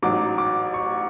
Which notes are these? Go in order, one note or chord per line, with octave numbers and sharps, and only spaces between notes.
A1 G#2 F#3 D6
D6
C#6